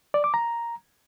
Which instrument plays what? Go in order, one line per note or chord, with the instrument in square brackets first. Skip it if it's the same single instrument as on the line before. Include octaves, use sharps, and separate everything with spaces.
[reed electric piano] D5
D6
A#5